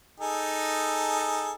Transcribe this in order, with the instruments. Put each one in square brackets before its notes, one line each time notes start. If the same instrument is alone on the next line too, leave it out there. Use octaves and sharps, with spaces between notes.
[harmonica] D#4 G#4 A4